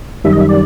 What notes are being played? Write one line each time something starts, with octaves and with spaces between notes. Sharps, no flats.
F#2 D#3 G3 E5
D#5
E5
D5